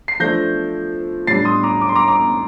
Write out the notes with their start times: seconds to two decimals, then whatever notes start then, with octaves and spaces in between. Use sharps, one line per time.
0.08 C7
0.20 F3 A3 D4 G6 A#6
1.27 A2 G3 D4 A6 C7
1.45 C6 D#6
1.63 A#5 D6
1.81 D6
1.89 C6
1.95 A#5 D6
2.08 A#5 D6